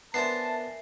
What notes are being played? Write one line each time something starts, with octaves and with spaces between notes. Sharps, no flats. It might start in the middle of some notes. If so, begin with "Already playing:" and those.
B3 D4 A#4 C5 E5 G#5 A5 C7